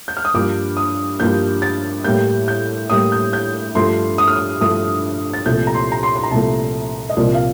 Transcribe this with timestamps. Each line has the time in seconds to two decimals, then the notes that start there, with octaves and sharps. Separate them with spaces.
0.08 G6
0.17 F6
0.25 D#6
0.34 G2 F3 A#3 D6
0.77 D#6
1.20 G2 F3 A#3 G6
1.62 A6
2.04 A2 G3 A#3 G6
2.48 G6
2.90 A2 G3 A#3 D#6
3.12 G6
3.33 G6
3.75 G2 F3 A3 C6
4.18 D#6
4.28 F6
4.36 D#6
4.61 G2 F3 A3 D#6
5.33 A6
5.46 C2 A#2 F3 A3 G6
5.67 A#5
5.74 C6
5.92 A#5
6.03 C6
6.16 C6
6.23 A#5
6.31 C2 A#2 F3 A3 A5
7.10 D#5
7.17 C2 A#2 F3 A#3 D5
7.34 F5